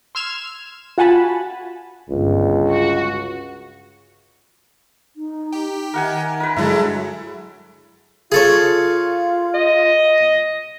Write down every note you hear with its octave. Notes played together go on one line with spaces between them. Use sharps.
C6 E6 F6 G#6 E7
F4 F#4 F#5 G#5 A5 B5
G1 C#2
F#4
D#4
G4
D#3 A#4 F#5 G#5
A#4 B4
G2 D3 F#3 G#3 E4 A4
F4 G#4 A4 C#5
D#5